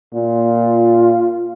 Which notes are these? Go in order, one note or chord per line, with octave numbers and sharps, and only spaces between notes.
A#2 F4